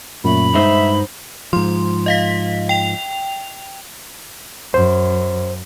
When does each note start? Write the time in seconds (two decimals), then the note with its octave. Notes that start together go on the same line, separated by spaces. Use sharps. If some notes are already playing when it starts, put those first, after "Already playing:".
0.24 F#2 A#2 A3 B5
0.54 G2 G#3 D#4 C5 E5
1.53 G#2 F3 C6
2.06 D#5 F5 B6
2.69 G5 F7
4.74 F#2 C5